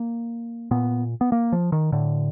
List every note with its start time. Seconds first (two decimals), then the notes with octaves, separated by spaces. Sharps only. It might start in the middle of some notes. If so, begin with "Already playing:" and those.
Already playing: A#3
0.71 A#2 B3
1.21 B3
1.32 A#3
1.52 F3
1.72 D#3
1.92 A2 D3